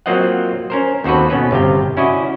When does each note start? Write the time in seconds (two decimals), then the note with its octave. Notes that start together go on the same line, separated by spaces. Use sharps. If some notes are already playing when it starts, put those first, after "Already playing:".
0.06 F#3 A#3 C4 F4 D#5 F#5
0.70 C#4 A#4 C5
1.04 D#2 C4 F#4 A4 B4
1.30 B2 B3 C#4 B4
1.51 G1 C3 F5 G5
1.97 C#4 E4 F#4 D5 D#5